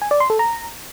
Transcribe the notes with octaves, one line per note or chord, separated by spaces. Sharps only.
G#5
D5
C6
A4
A#5